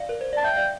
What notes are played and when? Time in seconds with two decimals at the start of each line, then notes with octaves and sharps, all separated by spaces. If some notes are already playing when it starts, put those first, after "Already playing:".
Already playing: D5 F5
0.09 A#4
0.21 C5
0.33 D5 A5
0.44 E5 G5
0.56 D5 F5